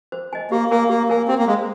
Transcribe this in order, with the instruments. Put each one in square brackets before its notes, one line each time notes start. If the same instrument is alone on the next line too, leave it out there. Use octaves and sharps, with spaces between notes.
[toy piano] C5
D#5 G#5
[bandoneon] A#3 [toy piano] G4
[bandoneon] A#3 [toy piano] A#4 C#5 G#5
[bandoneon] A#3 [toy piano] G4
[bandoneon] A#3 [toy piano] A#4 C#5 G#5
[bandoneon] C4 [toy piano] G4
[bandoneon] A#3
[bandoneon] G#3 [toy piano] C5 F5